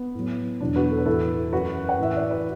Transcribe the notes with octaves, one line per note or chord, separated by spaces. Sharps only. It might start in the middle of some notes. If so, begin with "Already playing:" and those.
Already playing: B3
A2 F#3
E2 B2 F#3 D4
F#4 B4
A4
B4
A2 E3 E4 A4
F#2 F#3 F#4 B4
F#5
A2 E3 E5
D5
B4